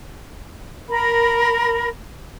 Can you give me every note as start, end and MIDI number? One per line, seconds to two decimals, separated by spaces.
0.89 1.87 70
0.89 1.87 83